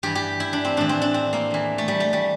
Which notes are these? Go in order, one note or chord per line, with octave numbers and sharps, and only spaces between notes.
G2 E3 G4
G4
E4
D4
C4
A2 E3 D4
C4
D4
C4
A#3
E2 E3
A3
G3
A3
G3